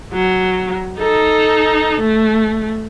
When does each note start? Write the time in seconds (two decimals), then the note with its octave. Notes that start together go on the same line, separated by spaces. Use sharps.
0.13 F#3
0.99 D#4 A4
2.00 A3